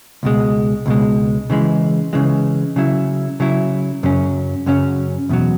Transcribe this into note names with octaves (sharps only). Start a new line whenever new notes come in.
C#2 B2 G#3
C#2 B2 G#3
C#3 E3 G#3
C#3 E3 G#3
C#3 F#3 E4
C#3 F#3 E4
F#2 C#3 F#3 C#4
F#2 C#3 F#3 C#4
E2 B2 F#3